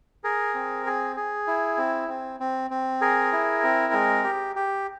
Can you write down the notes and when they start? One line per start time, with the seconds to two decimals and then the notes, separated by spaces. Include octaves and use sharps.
0.24 G#4 A#4
0.54 C4
0.86 G#4
1.16 G#4
1.47 E4
1.78 C4
2.09 C4
2.40 C4
2.71 C4
3.01 G#4 A#4
3.32 E4
3.63 C4
3.93 G#3
4.24 G4
4.56 G4